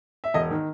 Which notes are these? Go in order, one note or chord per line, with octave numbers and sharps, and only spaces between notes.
E5
E1 D#5
D#3